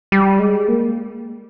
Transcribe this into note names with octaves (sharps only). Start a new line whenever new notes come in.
G3
G#3
A#3